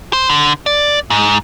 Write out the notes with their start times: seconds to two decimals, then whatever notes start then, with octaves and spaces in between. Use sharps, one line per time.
0.13 C5
0.30 D3
0.66 D5
1.10 G#2